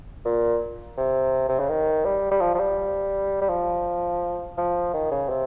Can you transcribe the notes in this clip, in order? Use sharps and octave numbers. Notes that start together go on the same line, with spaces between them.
A#2
C3
C3
C#3
D#3
G3
G3
F3
F3
G3
G3
F3
F3
D#3
C#3
C3